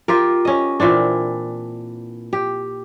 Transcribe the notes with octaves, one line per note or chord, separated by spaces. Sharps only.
F4 G4 A#4
C#4 D#5
A#2 E3 C4 D4
G4